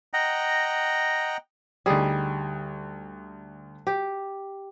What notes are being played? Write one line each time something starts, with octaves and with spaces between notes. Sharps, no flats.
D#5 F#5 G5 A#5
D2 G3 D#4 G#4 D#6
G4